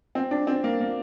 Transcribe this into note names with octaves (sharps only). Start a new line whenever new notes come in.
C4
D4
C4
A#3
A#3